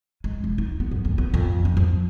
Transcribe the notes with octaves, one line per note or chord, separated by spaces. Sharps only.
G#3
E1
D#4
B3
F#2
D2
B3
F2
D4
F3